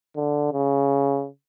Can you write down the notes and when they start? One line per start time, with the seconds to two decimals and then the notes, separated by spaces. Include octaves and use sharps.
0.16 D3
0.52 C#3